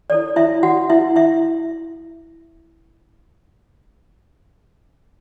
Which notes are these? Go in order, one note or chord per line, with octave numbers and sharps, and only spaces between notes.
E4 A4 C#5 D5
E4 E5
F#4 F#5
E4 E5
E4 E5